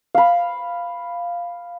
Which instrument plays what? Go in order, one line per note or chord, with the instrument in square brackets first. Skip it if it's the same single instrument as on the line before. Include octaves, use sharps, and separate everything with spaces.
[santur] F5 B5